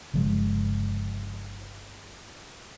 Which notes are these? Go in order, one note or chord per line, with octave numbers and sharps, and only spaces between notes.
G1 C#3 F3 G#3